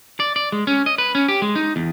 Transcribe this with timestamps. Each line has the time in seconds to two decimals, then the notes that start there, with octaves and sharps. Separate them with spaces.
0.20 D5
0.36 D5
0.52 G#3
0.67 C#4
0.86 D#5
0.98 B4
1.15 C#4
1.28 G4
1.42 G#3
1.55 D#4
1.76 E2